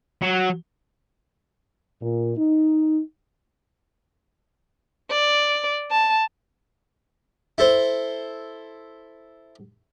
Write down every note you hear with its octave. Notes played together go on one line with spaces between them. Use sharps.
F#3
A#2
D#4
D5
A5
E4 A4 C5